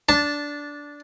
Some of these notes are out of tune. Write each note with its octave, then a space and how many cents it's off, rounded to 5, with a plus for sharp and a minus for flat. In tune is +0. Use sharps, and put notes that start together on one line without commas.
D4 -15 A5 +0